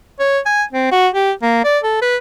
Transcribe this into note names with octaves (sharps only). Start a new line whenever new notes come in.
C#5
G#5
C4
F#4
G4
A#3
D5
A4
B4